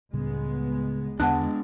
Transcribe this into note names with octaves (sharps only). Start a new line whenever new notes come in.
C#2 A2 C#3 G3 G#3 B3
E2 D3 G#3 B3 D4 F#5 A5 F#6